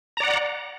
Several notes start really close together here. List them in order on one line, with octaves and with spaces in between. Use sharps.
A#5 D5 F#5